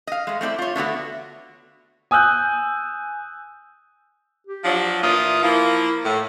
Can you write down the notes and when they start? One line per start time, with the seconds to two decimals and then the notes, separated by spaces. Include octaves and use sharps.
0.07 D#5 F5
0.27 G#3 A3
0.41 A3 C4 E4 D5
0.58 F4 C#5
0.76 D3 A3 B3 F#4
2.11 G#5 D#6 E6 F#6 G6
4.47 G4
4.65 F3 F#3 D4
5.03 A#2 E3 F4 D#6
5.43 F3 A#3 E4
6.05 A2